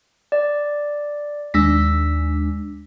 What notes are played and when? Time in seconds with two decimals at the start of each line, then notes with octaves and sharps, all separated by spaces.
0.32 D5
1.54 D#2 G#3 D4 E6 A#6 B6